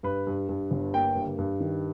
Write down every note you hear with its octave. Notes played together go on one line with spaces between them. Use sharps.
G2 B4
G2
G2
G1
A#3 G5
G2
G2
D#3